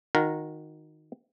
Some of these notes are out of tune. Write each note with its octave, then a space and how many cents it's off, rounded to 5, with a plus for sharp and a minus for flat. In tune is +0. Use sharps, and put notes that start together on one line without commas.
D#3 +0 F#4 -30 A#4 +0